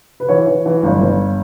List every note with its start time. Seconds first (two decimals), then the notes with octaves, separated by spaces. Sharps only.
0.20 B4
0.28 E3 C#5
0.47 E3
0.66 E3
0.83 G1
1.01 G1